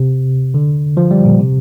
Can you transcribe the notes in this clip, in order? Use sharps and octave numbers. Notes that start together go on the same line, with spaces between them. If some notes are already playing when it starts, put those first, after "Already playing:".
Already playing: C3
D3
F3
G3
A#2
C3